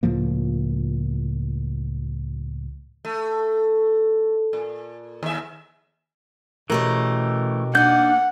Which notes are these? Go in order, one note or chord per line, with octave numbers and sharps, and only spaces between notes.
C#2 A2 F3 A#3
A3
A#2
D#2 E5
B2 E3 A3 C#4 G4 A#4
A#3 D4 D#4 F#5 G6